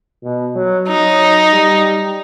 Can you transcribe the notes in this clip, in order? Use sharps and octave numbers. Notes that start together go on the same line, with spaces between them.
B2
F#3
F#3 D#4
G3